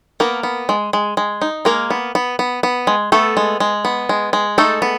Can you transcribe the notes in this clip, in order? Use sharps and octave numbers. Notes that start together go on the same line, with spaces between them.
A#3 B3 A#4
B3
G#3
G#3
G#3
D#4
G#3 A#3 A#4
B3
B3
B3
B3
G#3
A3 B3 A4
G#3
G#3
B3
G#3
G#3
A3 D#4 A4
B3